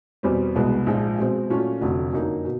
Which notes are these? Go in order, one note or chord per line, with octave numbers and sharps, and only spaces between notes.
E2 B2 G3 C4
C2 B2 G#3 B3
A#1 G#2 F3 G#3
B2 G#3 C4
A#2 F#3 A3 C#4 F4
F1 F2 D3 F#3 A3
F#2 D3 F3 A#3 D#4
B2